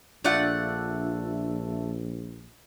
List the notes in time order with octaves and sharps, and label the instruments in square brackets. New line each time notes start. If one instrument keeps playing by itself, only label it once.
[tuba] A#1 [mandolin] A3 D5 F#5 [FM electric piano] D4 F4 E5